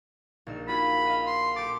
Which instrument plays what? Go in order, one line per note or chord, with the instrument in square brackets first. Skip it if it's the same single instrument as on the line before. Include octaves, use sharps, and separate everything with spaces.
[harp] A#1 D#4 E6
[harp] F4 F#4 G#4 [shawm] B5
[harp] F#4 D#5 F5
[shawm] C6
[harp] G4 A4 [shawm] D6